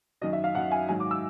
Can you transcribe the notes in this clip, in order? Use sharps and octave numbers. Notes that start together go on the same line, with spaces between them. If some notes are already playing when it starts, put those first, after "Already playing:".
F#2 D#3 F#3 D#5
E5
F5
F#2 D#3 F#3 F#5
G#5
G#2 D#3 F#3 G#5
D6
E6